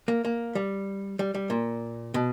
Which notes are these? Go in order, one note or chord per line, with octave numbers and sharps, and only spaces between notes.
A#3
A#3
G3
G3
G3
A#2
B2